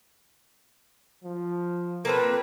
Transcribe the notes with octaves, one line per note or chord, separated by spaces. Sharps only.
F3
A#3 C4 F4 A4 B4